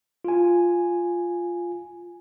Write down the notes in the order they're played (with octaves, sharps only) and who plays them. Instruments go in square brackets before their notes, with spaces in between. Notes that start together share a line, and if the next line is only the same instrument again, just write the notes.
[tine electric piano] F4 G#5